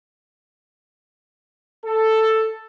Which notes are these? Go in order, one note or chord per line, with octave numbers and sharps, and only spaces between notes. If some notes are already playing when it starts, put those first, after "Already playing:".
A4